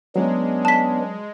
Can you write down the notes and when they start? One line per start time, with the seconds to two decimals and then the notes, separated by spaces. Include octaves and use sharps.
0.16 F#3 G#3 B3 C#4 D4
0.65 A5 B6